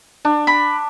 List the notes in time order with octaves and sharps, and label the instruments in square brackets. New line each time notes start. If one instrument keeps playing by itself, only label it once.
[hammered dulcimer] D4
[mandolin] B5